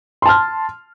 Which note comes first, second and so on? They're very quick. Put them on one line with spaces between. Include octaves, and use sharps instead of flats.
C6 A5 F6